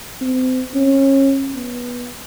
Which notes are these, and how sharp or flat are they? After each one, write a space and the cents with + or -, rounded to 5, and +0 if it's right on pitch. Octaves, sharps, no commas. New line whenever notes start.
C4 -30
C#4 -25
B3 -20